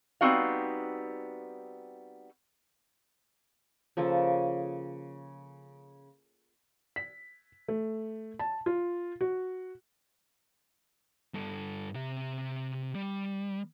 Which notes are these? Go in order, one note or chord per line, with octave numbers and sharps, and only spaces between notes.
G3 B3 C4 D#4 F#4 F5
C#3 F3 A#3 A4
B6
A3
A5
F4
F#4
G2 A4
C3 E5
G3